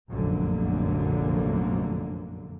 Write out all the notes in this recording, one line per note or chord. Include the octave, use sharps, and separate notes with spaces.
F1 A#1 F#2 D3 A#3